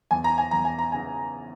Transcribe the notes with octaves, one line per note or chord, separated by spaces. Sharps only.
E2 G#5
A#5
G#5
E2 A#5
G#5
A#5
C#3 G#5